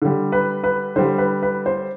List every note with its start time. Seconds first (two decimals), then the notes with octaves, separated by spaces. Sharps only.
0.02 D3 G3
0.32 B4
0.64 B4
0.96 D3 G3 C5
1.18 B4
1.42 B4
1.66 C5